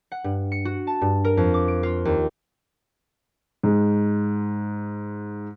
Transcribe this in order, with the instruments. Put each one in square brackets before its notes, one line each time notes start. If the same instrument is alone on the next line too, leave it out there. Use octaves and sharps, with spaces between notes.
[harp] F#5
G2
C#7
F#4
A5
G2
A#4
F2
D6
D7
F4
D#2
[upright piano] G#2 G#3